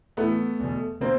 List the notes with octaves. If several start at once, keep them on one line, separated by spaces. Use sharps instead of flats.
A2 E3 A3 B3
E2 B2
B2 A#3 C4